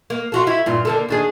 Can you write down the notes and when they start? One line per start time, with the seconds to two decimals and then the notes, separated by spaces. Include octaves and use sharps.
0.10 A#3
0.32 F4 F#4 A4
0.47 E4
0.66 G2 A#2 F4
0.85 D3 A#3 A4
1.09 D#2 D4 G#4